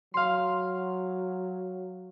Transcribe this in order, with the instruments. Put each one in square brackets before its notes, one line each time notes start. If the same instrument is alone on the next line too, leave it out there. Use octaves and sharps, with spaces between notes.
[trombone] F#3 [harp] F5 C6